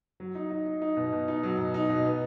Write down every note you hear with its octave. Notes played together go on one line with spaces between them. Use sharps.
F#3
D#4
D#4
D#4
D#4
B2
B2
D#4
F#3
B2
D#4
B2
B3